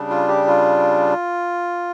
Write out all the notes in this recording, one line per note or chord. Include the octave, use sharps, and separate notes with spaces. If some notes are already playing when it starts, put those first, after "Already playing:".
Already playing: C#3 G3 D4
F4
G4
F4